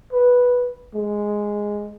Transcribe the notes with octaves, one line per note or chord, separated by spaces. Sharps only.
B4
G#3